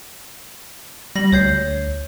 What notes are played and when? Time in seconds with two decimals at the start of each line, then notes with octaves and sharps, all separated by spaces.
1.16 G3 A#6 F#7
1.32 D2 C#5 G6 C7